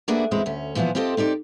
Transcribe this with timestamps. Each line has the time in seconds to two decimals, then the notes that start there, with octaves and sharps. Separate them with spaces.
0.08 A3 A#3 D4 F#4 G#4 B4
0.31 E2 F#3 G#3 C4 E4
0.46 D2 C#4
0.75 A#2 E3 F3 B3 F#4
0.95 C4 F4 G4 A4 B4 D#5
1.17 C4 D#4 G4 D5